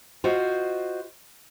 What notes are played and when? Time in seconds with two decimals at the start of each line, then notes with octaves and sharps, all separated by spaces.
0.24 F4 F#4 C5 D#5